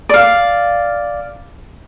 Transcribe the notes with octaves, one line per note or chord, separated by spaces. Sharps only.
D5 F5